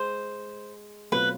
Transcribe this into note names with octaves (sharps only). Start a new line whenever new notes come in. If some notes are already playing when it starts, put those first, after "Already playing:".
Already playing: G#3 C5
B2 F#3 A3 C4 F4 B4